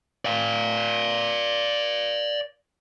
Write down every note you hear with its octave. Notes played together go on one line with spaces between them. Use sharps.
D5 F5